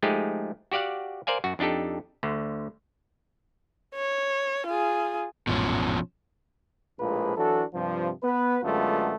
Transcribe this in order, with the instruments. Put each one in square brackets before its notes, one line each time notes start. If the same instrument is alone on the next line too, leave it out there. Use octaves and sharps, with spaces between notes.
[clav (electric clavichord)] F3 G#3 A3 D#4 G4 G#4
F#4 G4 D5 F5 F#5
A#4 C5 D5 F5 G#5
F#2 F#4
F2 D4 D#4 G4 A4
D2 D3
[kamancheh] C#5
F4 G#4
[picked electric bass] A1 F2 G#2 [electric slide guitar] B2 F3 C#4
[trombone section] A#1 A2 F3 G#3 A#3 B4
E3 F#3 D4 F#4 A4
G2 C3 F3
B3 B4
F#2 D3 G#3 A3 B3 F4